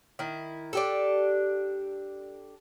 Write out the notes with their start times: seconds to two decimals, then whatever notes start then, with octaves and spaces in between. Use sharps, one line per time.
0.19 D#3 E4
0.73 D4 G4 A4